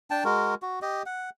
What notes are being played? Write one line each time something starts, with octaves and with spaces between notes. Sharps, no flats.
D4 G5 A5
G#3 F#4 A#4
F#4
G4 D#5
F#5